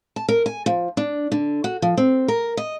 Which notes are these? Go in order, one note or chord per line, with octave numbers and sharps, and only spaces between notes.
A5
A#4
G#5
F3
D4
D3
F#4
F3
C4
A#4
D#5